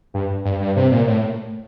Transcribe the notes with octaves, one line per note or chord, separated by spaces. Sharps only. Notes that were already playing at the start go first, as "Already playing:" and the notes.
G2
G2
G2
C3
A#2
A2